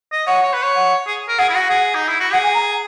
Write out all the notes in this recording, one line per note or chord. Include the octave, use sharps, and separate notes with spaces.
D#5
C#5 F#5
C#5
B4
C#5
F#5
G#4
A#4
G#4 F#5
E4
F#4 F#5
G#4 F#5
D#4
E4
F#4
G#4 F#5
G#5
A#5